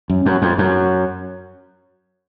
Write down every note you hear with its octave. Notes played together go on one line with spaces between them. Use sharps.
F#2
F#2
F2
F#2